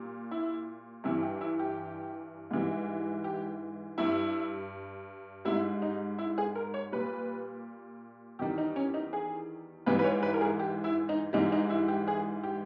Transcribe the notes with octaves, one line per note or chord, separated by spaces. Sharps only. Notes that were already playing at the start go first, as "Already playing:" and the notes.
Already playing: A#2 G3
E4
G2 E3 G3 E4
G4
E4
G4
G#2 E3 G3
G4
G2 G3 E4
G#2 G3 E4
D#4
E4
G#4
A#4
C#5
A#2 G3 B4
E2 D#3 G3 G4
D#4
C#4
D#4
G#4
G#2 E3 G3 B4
B4
C#5
B4
A#4
G#4
G4
E4
D#4
G#2 E3 G3 D#4
D#4
E4
G4
G#4
G4